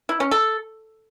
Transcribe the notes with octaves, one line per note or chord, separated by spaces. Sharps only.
E4
C#4
A4